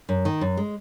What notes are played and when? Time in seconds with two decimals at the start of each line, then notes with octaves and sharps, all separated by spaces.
0.09 F#2
0.25 D#3
0.41 F#2
0.57 G#3